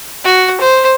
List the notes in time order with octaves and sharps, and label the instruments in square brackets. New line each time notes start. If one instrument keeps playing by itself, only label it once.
[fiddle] F#4
C5